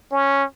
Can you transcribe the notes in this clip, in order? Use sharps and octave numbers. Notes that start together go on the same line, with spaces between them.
C#4